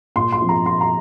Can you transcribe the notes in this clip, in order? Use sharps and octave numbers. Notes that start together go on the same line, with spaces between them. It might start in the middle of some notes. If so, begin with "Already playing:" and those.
A#2 C6
C6
F3 C4
A#5
A#2 C6
A#5